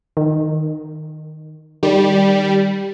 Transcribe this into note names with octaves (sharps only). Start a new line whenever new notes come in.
D#3
D#3 G3